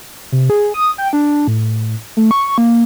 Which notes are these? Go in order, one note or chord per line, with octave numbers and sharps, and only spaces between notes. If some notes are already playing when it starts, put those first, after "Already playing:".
C3
G#4
D#6
G5
D4
A2
A3
C#6
A#3